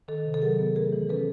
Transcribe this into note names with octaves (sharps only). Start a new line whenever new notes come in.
D#3 A4
C3
A4
F#3 G#4 A#4
B3
A3 G#4 A#4
E3
C#4 A4 B4